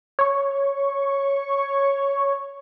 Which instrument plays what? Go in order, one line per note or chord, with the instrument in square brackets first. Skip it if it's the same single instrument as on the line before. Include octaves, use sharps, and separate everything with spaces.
[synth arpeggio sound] C#5 C#6